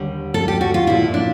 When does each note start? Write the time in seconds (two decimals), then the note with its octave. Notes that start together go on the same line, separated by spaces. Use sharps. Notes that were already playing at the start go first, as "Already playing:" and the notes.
Already playing: D#2 D3 G3
0.34 A4
0.48 G4
0.61 F#4
0.74 F4
0.87 A#2 F3 E4
1.14 D4